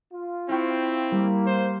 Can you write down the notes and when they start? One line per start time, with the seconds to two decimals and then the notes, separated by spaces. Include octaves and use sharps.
0.10 F4
0.49 C4 E4 F5 G5 C#6
1.12 G3 A#3
1.46 C5